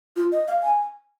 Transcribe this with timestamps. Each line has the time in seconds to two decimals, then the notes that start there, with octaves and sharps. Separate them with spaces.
0.16 F4
0.32 D#5
0.48 F5
0.63 G#5